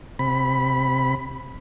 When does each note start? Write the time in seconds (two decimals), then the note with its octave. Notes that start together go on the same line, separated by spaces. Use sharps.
0.19 C3 B5